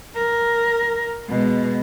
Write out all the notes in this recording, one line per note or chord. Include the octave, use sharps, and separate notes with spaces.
A#4
B2 G#3